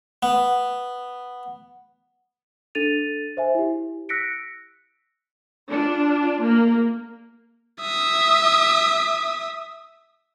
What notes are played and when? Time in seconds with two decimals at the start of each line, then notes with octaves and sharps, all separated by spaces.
0.23 B3
2.75 D4 A4 A6 D#7 F7
3.37 C5 E5 G#5
3.55 E4 G4
4.09 E6 F#6 A#6 B6 C#7 D7
5.70 D4 F4
6.43 A#3
7.81 E5 D#6